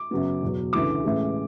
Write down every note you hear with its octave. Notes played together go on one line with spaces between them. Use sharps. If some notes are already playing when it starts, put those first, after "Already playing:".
Already playing: D6
F#2 C#3 F#3 B3
E2 B2 F#3
D2 C#3 E3 A3 D6
A1 A2 E3 G#3